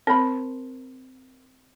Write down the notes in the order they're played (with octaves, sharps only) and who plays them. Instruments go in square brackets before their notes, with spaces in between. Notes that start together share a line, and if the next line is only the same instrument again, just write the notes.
[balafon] C4 [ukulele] A#4 C5 B5